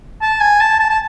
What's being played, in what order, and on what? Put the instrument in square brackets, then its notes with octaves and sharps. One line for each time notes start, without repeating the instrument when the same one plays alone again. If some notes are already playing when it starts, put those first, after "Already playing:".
[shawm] A5
G#5
A5
A5
A5